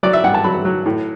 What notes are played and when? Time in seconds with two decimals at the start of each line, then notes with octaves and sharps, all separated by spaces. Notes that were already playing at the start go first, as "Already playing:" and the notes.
0.03 F#3 D5
0.13 E5
0.24 G2 F#5
0.34 A5
0.44 F#3 B5
0.65 F#3
0.86 A2